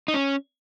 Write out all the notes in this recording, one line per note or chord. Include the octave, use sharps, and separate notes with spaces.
D#4
C#4